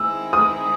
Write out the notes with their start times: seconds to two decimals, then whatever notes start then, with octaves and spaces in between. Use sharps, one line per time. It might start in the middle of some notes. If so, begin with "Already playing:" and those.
Already playing: D#3 G#3 C4 E4 G#4 E6
0.33 D#6